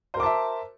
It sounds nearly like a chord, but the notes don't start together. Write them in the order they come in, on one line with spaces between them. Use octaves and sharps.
C5 A#4 D6 A5 E5